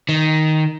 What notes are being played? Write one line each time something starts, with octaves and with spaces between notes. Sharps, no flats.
D#3